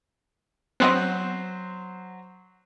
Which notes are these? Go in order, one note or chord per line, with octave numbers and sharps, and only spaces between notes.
F#3 B3 C4 C5 D#5 F#6